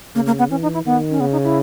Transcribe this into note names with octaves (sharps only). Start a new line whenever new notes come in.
C#3 A#3
A#3
B3
E3 C#4
D#4
E4
D#3 B3
C#4
C#3 B3
D#4
E4